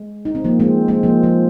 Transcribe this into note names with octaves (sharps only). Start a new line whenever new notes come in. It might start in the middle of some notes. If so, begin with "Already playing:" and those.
Already playing: G#3
D#4
C4
F3 A#3
G#3 C4
G#3 C4
F3 A#3
F3